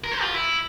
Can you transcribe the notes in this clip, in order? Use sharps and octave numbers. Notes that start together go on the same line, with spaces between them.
A#4
C5
F4
E4